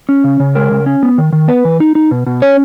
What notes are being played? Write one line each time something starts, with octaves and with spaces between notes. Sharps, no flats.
C#4
C#3
C#3
G#3 A#4
C#3
C#4
B3
D#3
D#3
B3 B4
E3
D#4
D#4
B2
B2
C#4 C#5